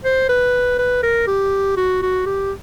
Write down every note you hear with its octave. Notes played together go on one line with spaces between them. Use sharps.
C5
B4
B4
A#4
G4
F#4
F#4
G4